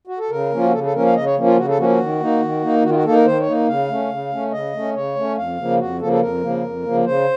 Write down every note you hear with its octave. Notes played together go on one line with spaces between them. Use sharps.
F#4
A4
C#3 A#4
F3 A#3 C#4 F4
F#4
C#3 A4
A4
F3 A#3 C#4 A#4
F5
C#3 D#5
C#5
F3 A#3 C#4
F4
C#3 F#4
A4
F3 A#3 C#4 F#4
F#4
D#3
A#3 D#4
D#3
A#3 D#4
D#3 F#4
F4
F#4
A#3 D#4 A4
A#4
D#3 C5
C#5
A#3 D#4
C#3 F5
A3 C#4
C#3
A3 C#4
C#3 D#5
A3 C#4
C#3 C#5
A3 C#4
F2 F5
C#3 F3 A#3
F2 F#4
C#3 F3 A#3 A4
A4
F2 A#4
C#3 F3 A#3
F2
C#3 F3 A#3
C#3 C5